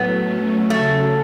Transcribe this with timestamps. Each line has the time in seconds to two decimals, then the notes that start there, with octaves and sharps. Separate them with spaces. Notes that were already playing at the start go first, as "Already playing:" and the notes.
Already playing: A2 F#3 A3 B3
0.25 F#3 A3 C#4
0.70 C#3 F#3 A3 C#4